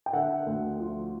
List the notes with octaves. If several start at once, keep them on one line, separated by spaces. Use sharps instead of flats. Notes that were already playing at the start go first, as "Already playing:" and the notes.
G5
D3 E5 F#5
D2
F3